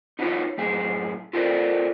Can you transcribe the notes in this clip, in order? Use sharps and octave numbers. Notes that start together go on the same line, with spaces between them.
D#4 F4 F#4 A4 B4 C#5
F#2 A2 G#4
F4 A4 A#4 C5 D5